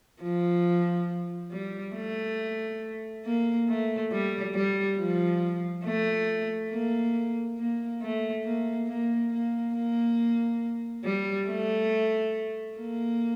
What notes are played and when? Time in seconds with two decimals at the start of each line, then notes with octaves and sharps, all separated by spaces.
0.22 F3
1.52 G3
1.95 A3
3.25 A#3
3.68 A3
4.11 G3
4.54 G3
4.98 F3
5.84 A3
6.71 A#3
7.58 A#3
8.01 A3
8.44 A#3
8.88 A#3
9.31 A#3
9.74 A#3
11.04 G3
11.48 A3
12.78 A#3